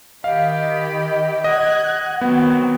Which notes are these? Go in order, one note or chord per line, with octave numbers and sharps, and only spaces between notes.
D#3 G4 D#5 F5 B5
D#5 F#5 F#6 G#6
D#3 F#3 B3 C4